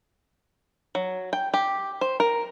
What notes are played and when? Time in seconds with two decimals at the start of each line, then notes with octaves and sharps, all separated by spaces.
0.95 F#3
1.33 G5
1.54 G4
2.01 C5
2.20 A#4